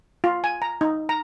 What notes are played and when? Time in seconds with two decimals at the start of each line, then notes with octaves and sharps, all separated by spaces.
0.24 F4
0.44 G#5
0.62 A#5
0.81 D#4
1.09 A#5